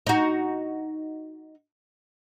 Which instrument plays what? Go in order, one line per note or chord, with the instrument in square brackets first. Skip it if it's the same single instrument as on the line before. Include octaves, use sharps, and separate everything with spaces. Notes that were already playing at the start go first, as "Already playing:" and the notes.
[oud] D#4 F#4